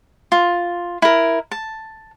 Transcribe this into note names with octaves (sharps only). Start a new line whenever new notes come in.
F4
E4 A#4
A5